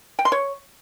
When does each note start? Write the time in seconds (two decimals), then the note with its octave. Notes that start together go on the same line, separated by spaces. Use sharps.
0.19 G5
0.25 C6
0.32 C#5